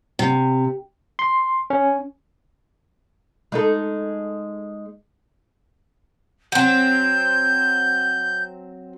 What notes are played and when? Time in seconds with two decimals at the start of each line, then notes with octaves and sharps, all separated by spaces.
0.19 C3
1.19 C6
1.70 C#4
3.52 G#3 D#4 A4
6.52 F#3 C4 G6